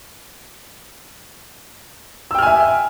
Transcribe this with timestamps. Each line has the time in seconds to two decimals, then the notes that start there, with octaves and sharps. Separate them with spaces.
2.31 E6
2.35 G5
2.39 F6
2.42 G#5
2.46 E5